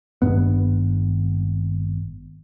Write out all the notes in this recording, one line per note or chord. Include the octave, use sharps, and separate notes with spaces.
G#1 G2 B3